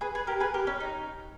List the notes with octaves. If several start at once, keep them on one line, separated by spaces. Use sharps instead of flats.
G#4 B4
G#4 B4
G4 A#4
G#4 B4
G4 A#4
C#4
D#4